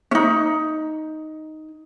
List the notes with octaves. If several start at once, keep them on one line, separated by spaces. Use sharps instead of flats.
C#4 D#4